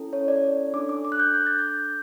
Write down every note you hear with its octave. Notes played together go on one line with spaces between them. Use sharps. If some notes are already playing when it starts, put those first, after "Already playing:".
Already playing: C#4 E4 A4
C#5
D5
D4 A4 D6
D6
D6
F#6
G6
G6
A6
G6